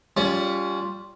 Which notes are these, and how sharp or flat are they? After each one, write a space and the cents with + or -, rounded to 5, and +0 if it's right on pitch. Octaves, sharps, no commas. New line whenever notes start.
G3 +0 C#4 +25 F4 +0